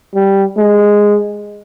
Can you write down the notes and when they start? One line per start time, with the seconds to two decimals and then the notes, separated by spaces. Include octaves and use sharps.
0.14 G3
0.57 G#3